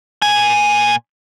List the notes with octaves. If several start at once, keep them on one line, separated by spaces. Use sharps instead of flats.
A#2 G#5